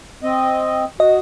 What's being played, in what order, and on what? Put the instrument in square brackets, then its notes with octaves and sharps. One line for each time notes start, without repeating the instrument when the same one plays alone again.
[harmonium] C4 D#5
[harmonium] F#4 [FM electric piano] D#5